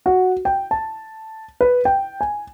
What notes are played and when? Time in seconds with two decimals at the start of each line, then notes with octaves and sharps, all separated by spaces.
0.06 F#4
0.45 G5
0.71 A5
1.61 B4
1.85 G5
2.21 G#5